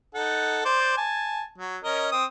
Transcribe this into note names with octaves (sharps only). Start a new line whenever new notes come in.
D#4 A4 F#5
C5 D5
G#5 A5
F#3
C#4 A#4 D#5
C4 D#6